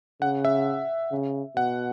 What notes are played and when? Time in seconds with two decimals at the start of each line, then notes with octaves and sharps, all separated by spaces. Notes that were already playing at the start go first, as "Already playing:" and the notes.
0.22 C#3 F#5
0.45 E5
1.11 C#3
1.56 B2 F#5